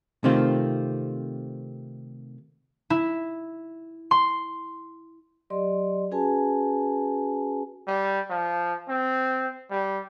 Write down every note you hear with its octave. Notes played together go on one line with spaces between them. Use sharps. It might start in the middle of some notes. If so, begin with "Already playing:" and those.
C3 D#3 A3 C4 F4
E4
C6
F#3 G4 D5 D#5 C6
C#4 F#4 G#4 B4 G#5 A5
G3
F3
C4
G3